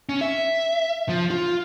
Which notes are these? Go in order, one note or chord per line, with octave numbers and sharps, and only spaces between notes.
C#4
E5
F3
F4